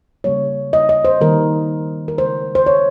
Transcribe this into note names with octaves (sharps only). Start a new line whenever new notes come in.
C#3 G3 A#3 C#5
D#5
D#5
C5
D#3 G3 A#3 A#4
A#4
C#3 G#3 C5
C5
C#5